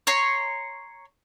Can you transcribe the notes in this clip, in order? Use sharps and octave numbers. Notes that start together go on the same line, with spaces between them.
C#5 A#5 C6